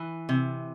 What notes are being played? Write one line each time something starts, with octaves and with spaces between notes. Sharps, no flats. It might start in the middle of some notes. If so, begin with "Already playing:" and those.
Already playing: E3
C3